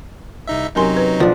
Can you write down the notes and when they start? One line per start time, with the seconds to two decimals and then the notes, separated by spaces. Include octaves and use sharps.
0.47 C2 D#4 E5
0.76 F#2 C3 F#3 D#4 A#4 G#5 C6
0.97 B4
1.20 B1 F3 D4